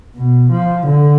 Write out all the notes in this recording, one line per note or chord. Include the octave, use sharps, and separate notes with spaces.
B2
F3
D3